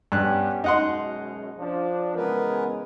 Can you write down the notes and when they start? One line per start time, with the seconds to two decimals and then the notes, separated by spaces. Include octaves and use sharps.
0.12 G2 B3 C#4 G4 F#6
0.64 F#2 B2 G#3 D#4 F#5 C6
1.57 F3 D4
2.16 C#3 E3 G#3 B3 A#4 B4